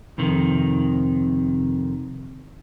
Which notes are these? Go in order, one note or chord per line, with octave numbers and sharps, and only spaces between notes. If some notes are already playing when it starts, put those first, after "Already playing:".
F2 C3 D#3